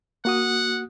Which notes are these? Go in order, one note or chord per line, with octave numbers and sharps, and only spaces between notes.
A#3 F#4 F#5 D#6